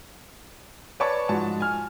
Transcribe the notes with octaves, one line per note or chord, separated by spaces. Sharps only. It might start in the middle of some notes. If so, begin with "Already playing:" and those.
B4 C#5 D5 A5 C#6
G#2 F3 F#4 A5
G#5 F6